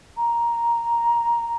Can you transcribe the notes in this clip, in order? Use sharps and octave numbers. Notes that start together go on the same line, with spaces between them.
A#5